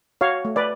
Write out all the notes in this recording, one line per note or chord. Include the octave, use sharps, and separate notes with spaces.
F#4 C#5 F5
A3
B4 D5